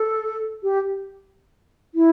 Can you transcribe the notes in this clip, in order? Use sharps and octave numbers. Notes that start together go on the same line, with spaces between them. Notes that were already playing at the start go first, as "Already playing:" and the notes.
Already playing: A4
G4
E4